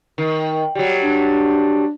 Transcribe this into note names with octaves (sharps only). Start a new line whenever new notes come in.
D#3
F#3 G3
D4